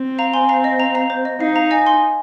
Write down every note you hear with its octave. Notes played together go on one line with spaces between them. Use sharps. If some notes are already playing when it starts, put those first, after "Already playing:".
Already playing: C4
F5 A#5
G#5 C6
F5 A#5
D#5
F5 A#5
F5 A#5
C5
D#5
D#4 F5
F5 A#5
D#5 G#5
G#5 C6